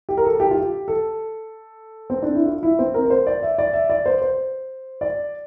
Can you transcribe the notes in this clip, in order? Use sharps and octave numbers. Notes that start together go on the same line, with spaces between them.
G4
A#4
A4
G4
F4
G4
A4
C4
D4
E4
F4
E4
C4
A#4
A#4
C5
D5
E5
D5
E5
D5
C5
C5
D5